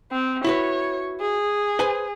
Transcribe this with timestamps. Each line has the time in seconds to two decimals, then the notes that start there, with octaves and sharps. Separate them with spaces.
0.12 C4
0.44 E4 F#4 B4 C#5
1.21 G#4
1.79 B4 C5 G#5